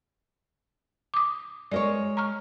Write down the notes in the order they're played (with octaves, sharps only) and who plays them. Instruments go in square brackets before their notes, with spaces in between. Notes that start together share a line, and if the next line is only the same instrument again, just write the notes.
[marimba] D6 D#6
[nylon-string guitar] G#3 A#4 C#5 [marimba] D5
[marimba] A#5 C#6 F6